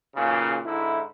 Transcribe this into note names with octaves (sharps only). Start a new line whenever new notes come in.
B1 A#2 C#3
G#2 D3 E4